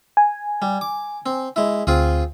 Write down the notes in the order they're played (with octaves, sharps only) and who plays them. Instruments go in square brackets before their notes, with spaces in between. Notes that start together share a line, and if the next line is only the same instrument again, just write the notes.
[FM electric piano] G#5
[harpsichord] G3
D6
C4
G#3 E4
[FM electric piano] D2 [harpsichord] C4 F4 G#4